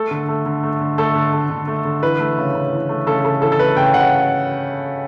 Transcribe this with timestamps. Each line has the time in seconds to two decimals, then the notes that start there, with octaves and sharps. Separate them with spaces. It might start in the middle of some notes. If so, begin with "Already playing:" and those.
Already playing: A3 A4
0.11 D3
0.28 A3
0.46 D3
0.63 A3
0.81 D3
0.98 A3 A4
1.15 D3
1.33 A3
1.50 D3
1.67 A3
1.85 D3
2.03 E3 B4
2.20 A3
2.38 C#3
2.55 C#3
2.72 E3
2.89 A3
3.06 C#3 A4
3.25 C#3 A4
3.42 E3 A4
3.52 A4
3.59 A3 B4
3.77 C#3 G5
3.94 C#3 F#5